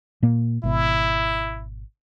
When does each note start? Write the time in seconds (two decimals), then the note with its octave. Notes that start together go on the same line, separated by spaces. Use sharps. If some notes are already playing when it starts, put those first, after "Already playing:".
0.23 A#2 A#3
0.63 G#1 B2 E4